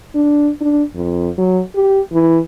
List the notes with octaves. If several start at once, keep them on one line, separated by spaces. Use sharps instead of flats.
D4
D4
F2
F#3
G4
E3